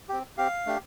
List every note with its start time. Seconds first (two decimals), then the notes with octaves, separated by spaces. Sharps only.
0.09 C4 G4
0.37 C4 G4 F5
0.66 A3 D4 G4